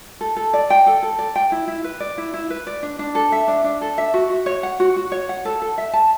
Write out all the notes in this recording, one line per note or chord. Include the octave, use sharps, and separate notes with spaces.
A4
A4
D5
G5
A4
A4
D5
G5
E4
E4
B4
D5
E4
E4
B4
D5
D4
D4
A4
E5
D4
D4
A4
E5
F#4
F#4
C#5
F#5
F#4
F#4
C#5
F#5
A4
A4
E5
A5